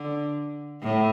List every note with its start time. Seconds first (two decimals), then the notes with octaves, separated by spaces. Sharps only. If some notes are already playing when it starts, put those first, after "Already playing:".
Already playing: D3
0.82 A2